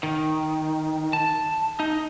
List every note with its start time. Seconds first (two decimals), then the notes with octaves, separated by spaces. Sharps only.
0.03 D#3
1.13 A5
1.80 D#4